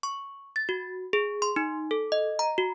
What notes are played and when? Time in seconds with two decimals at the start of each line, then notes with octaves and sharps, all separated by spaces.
0.03 C#6
0.56 A6
0.69 F#4
1.13 G#4
1.42 C6
1.56 D#4
1.91 A4
2.12 D#5
2.39 A#5
2.58 F#4